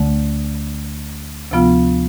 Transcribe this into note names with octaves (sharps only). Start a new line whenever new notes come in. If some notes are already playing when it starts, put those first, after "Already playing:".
Already playing: D2 D3 A3
D2 C3 F3 B3 F4